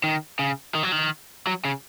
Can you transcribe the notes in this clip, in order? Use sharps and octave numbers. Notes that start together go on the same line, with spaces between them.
D#3
C#3
D#3
F#3
D#3
F#3
C#3